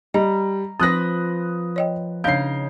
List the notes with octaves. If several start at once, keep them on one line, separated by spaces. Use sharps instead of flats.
G3 D#5 A#5
F3 C4 B4 D#6 F#6 A#6
C#5 D#5 G5
C#3 D4 D#4 F5 G6 C7